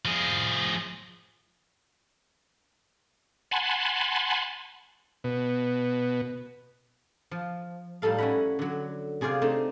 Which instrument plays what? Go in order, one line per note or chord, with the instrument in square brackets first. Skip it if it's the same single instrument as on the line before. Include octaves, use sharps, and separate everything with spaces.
[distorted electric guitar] F3 G#4
[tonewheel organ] F#5 G#5 A5 B5 C6
[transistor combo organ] B2
[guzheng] F3
A2 G3 D#4 A4 F5
C#4 E4 F#5 A#5 B5
D3 F#3
C3 G#4 C5 D5 F5 G5
A3 C4 D4 D#4